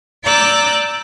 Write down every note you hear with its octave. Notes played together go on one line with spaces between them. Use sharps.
D5 A#5 D6 E6 F#6 G6